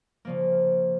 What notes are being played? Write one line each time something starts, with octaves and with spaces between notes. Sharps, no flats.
C#3 F3 A#3